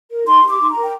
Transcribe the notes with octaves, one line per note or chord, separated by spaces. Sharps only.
A#4
D#4 C6
G4
D6
D#4 C6
A#5
A#4
G5